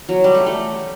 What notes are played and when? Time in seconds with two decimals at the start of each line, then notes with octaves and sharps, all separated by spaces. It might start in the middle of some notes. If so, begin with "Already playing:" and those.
0.09 F#3
0.24 G3
0.35 A3
0.46 A3